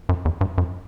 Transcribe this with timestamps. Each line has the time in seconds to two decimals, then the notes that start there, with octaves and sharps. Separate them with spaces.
0.09 F#2
0.25 E2
0.41 G2
0.58 F#2